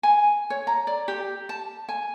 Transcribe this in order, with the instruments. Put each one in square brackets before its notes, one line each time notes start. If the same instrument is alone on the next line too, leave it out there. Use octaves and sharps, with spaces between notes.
[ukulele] G#5
C#5
A#5
D5
G4
A5
G#5